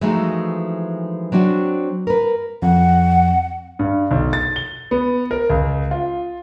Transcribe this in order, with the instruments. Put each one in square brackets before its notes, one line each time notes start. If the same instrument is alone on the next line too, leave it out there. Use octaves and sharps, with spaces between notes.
[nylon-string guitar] E3 F3 G#3 A3 D#4 F#4
F#3 C4 D4 F#4
A#4 B4
[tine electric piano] F2 [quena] F#5
[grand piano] G2
B1
A6
G7
B3
A#4
C#2
F4